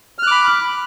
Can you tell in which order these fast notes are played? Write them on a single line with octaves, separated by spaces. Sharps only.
F6 F#6 D6 B5